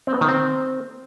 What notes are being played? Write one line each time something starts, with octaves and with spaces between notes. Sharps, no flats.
C4
B3
D#3
C4